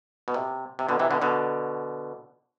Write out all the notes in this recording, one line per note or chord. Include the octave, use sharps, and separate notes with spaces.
B2
C3
C3
B2 D3
C3 E3
B2 D3
B2 D3